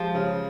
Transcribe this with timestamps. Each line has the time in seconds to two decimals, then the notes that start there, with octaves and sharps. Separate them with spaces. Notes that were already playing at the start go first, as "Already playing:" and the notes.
Already playing: C3 F3 G#3
0.15 C#3